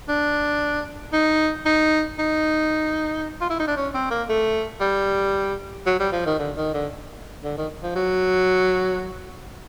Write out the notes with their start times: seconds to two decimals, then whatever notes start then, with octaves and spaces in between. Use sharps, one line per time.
0.08 D4
1.13 D#4
1.65 D#4
2.19 D#4
3.41 F4
3.50 E4
3.59 D#4
3.67 D4
3.76 C#4
3.94 C4
4.11 A#3
4.29 A3
4.80 G3
5.86 F#3
5.99 G3
6.12 F3
6.26 D#3
6.39 D3
6.57 D#3
6.74 D3
7.44 D3
7.57 D#3
7.83 F3
7.96 F#3